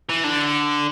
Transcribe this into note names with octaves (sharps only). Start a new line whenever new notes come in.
E3
D3